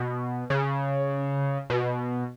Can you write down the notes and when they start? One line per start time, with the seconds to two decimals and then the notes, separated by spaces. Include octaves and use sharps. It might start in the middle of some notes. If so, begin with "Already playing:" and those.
Already playing: B2
0.50 C#3
1.70 B2